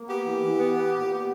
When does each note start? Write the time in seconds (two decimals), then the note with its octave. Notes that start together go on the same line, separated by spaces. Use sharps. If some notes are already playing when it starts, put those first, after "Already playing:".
Already playing: A#3
0.08 B3 G4
0.26 E3
0.43 E3
0.59 B3
0.77 B3
0.93 A#2
1.11 B3